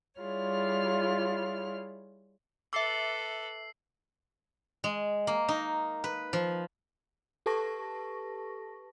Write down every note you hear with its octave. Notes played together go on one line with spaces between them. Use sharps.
G3 E4 F4 G#4 C#5 F6
A4 B4 E5 D6 E6 C7
G#3
A#3
D#4
B4
F3
G4 A4 B4 A5 C#6 A#6